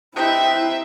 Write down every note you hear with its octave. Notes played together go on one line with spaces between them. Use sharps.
C4 D#4 E4 G4 B4 E5 G5